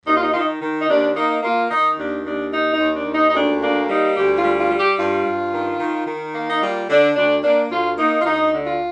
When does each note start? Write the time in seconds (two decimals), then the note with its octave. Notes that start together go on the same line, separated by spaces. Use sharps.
0.06 D#2 D#4
0.15 F4
0.23 D#4
0.32 D#3 F4
0.39 D#4
0.61 D#3
0.80 D#4
0.89 D#2 D4
1.16 A#3 D#4
1.43 A#3 F4
1.70 D#3 D#4
1.98 D#2 D4
2.25 D#2 D4
2.52 D#3 D#4
2.73 D#4
2.79 D#2
2.94 D4
3.06 D#2
3.13 D#4
3.30 D#4
3.34 D2 D4
3.61 A#3 D4
3.89 G3 D#4
4.15 D2 G4
4.36 F4
4.43 G3
4.57 F4
4.71 G3
4.78 G4
4.98 G2 F4
5.25 G2
5.52 D#3
5.79 D#3
6.07 D#3
6.34 A#3
6.50 D#4
6.61 G3 F4
6.89 D3 D4
7.16 D2 D4
7.43 A#3 D4
7.71 D2 F4
7.98 A#3 D#4
8.21 F4
8.25 D2 D#4
8.52 D3
8.66 F4